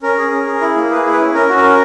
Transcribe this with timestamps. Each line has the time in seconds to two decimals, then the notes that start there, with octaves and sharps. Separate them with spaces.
0.02 C#4 A#4
0.18 G#4
0.32 C#4
0.47 G#4
0.61 E4
0.76 A#3
0.91 G#4 B4
1.06 E4
1.13 B4
1.20 C#4
1.34 C#4 A#4
1.49 F#4
1.57 A#4
1.64 C#4